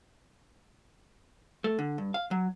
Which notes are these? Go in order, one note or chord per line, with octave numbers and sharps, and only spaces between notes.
A3
D3
G2
F5
F#3